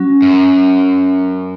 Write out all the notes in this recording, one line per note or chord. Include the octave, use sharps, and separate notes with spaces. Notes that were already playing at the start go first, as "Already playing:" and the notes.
Already playing: F#3 C#4 F#4
F#2